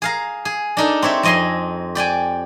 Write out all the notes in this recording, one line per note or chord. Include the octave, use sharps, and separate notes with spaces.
G#4 F5 A#5
G#4
D4 D#4 A4
C4 G4 C#5 E5
F2 C4 D#5 G#5 C6
G4 D5 G5 G#5